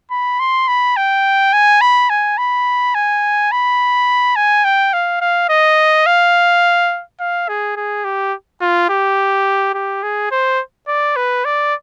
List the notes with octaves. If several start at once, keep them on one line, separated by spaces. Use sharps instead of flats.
B5
C6
B5
G5
G#5
B5
G#5
B5
G#5
B5
G#5
G5
F5
F5
D#5
F5
F5
G#4
G#4
G4
F4
G4
G4
G#4
C5
D5
B4
D5